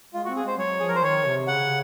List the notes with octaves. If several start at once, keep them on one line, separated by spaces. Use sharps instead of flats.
G#3 F4
F#4
C4
G#4
G#3 C5
F#3 C#5
F3 G#4
A#4
C5
D#3 C#5
C3
C#3 F#5